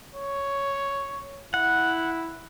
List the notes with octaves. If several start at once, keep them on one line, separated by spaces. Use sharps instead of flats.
C#5
E4 F#5